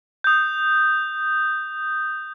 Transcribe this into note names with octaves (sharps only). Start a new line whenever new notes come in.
D#6 G6